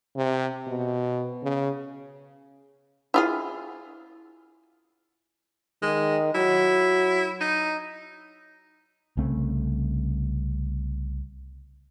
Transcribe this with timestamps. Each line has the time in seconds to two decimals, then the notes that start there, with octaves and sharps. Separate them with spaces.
0.16 C3
0.67 B2
1.43 C#3
3.14 E4 F4 G#4
5.82 D#3 G#3
6.34 F#3 E4
7.41 D#4
9.17 C2 C#3 A3 C4